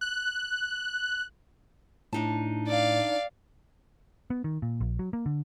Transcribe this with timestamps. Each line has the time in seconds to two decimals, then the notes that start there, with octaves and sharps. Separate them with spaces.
0.01 F#6
2.13 A2 D4 D#4 A5
2.67 D5 F5
4.30 B3
4.44 D#3
4.62 A#2
4.81 A#1
4.99 F#3
5.13 A#3
5.26 D3